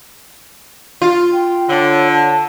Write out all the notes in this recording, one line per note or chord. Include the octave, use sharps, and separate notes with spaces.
F4
G5
D3 C#5
A5